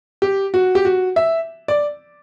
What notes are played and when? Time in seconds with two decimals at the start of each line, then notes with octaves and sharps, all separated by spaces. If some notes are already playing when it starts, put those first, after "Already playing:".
0.22 G4
0.54 F#4
0.75 G4
0.85 F#4
1.16 E5
1.68 D5